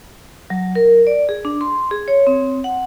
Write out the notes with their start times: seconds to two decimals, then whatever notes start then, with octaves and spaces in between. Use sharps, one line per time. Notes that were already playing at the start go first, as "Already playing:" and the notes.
0.50 F#3
0.75 A#4
1.07 D5
1.29 G#4
1.45 D4
1.61 C6
1.91 G#4
2.08 C#5
2.27 C4
2.64 F#5